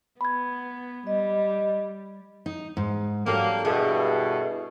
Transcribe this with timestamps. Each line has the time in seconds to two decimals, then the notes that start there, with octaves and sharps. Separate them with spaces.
0.21 B3 B5 G#6
1.07 G3 D#5
2.46 D#4
2.77 G#2
3.26 F#3 A#3 D4 G4 A4
3.65 G2 B2 E4 G#4 A4